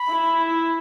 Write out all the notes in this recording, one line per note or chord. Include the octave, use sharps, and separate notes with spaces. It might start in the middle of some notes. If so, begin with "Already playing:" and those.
Already playing: B5
E4